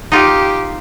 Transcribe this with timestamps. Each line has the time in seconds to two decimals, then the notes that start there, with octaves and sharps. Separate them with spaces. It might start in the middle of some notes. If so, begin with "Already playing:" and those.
0.12 D#4 F4 G4